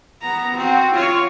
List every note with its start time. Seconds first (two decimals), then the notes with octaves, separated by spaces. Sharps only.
0.21 B3 A#5
0.56 C4 F#4
0.94 F4 C#5